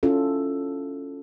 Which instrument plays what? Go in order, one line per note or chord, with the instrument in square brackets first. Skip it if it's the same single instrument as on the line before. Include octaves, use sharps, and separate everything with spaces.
[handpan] C#4 E4 F4 A4